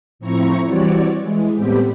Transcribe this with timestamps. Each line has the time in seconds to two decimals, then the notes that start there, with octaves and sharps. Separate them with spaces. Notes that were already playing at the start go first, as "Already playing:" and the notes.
0.19 A2 F3 C4 E4 A#5 C#6
0.66 E3 G3 C4 F#4 C#5 D5
1.22 E3 G#3
1.55 A2 G3 B3 C4 G4